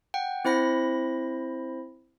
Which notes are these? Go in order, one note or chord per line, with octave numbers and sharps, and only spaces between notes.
F#5 G5
C4 E4 C5 B5 A#6